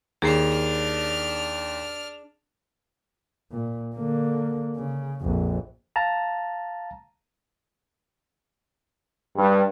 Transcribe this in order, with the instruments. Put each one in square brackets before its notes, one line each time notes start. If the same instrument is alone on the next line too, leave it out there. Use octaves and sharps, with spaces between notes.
[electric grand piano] D#2 A#5 C7 [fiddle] D4 F6 [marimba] G#4
[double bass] A#2
D3 A#3
C#3
A#1 F2
[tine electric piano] F5 A5 A#5
[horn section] G2